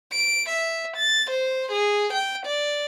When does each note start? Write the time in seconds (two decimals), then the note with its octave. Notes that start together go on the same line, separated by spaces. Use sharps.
0.12 D7
0.49 E5
0.96 A6
1.30 C5
1.71 G#4
2.13 G5
2.46 D5